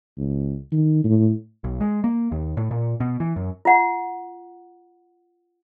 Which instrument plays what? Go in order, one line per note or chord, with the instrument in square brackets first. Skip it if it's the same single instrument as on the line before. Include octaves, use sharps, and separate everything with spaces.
[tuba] C#2
D#3
A2
[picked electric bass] B1
G#3
A#3
D#2
A2
A#2
B2
E3
F#2
[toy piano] F4 F#5